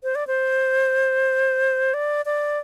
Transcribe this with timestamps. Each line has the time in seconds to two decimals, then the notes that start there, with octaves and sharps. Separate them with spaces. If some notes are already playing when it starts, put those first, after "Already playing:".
0.03 C5
0.15 D5
0.27 C5
1.94 D5
2.25 D5